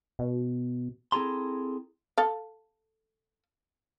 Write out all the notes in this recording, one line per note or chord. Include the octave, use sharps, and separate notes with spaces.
B2
C4 E4 G#4 A4 A#5 C6
A4 F5